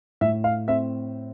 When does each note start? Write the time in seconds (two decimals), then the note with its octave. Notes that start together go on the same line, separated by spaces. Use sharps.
0.21 A2 E5
0.44 F5
0.68 C4 E5